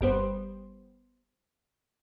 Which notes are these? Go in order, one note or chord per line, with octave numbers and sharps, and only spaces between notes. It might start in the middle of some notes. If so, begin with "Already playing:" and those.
G1 G3 B3 C5